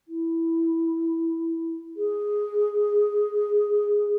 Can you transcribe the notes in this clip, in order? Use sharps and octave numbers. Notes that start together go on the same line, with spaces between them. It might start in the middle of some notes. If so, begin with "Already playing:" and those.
E4
G#4